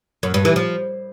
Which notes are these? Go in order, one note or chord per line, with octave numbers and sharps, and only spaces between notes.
F#2
G2
E3
F3